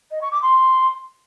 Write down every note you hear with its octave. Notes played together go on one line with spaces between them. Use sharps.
D#5
C#6
D6
C6